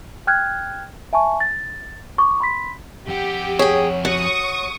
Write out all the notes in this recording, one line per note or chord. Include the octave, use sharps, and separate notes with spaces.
G5 F6 F#6 G#6
E5 G#5 A5 C#6
A6
C#6 D6
B5 C6 B6
F2 G4 F#5
G#4 C#5 G5
F#4 C#6 D#6